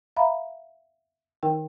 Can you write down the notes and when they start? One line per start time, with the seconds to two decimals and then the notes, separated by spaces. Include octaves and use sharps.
0.17 E5 F5 A#5 B5
1.43 D#3 D#4 A#4 G5